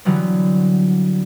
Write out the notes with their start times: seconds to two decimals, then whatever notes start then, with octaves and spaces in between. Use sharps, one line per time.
0.05 D3 E3 F#3 G3 B3